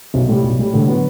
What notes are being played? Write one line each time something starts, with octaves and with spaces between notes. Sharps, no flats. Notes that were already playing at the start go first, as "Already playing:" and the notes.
B1 C3
A2 G3
B1
A2 G3
A2 D3
F#3 B3 F#4